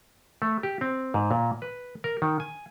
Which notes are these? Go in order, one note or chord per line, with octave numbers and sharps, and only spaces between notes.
A3
G4
C4
G#2
A#2
B4
A#4
D#3
G#5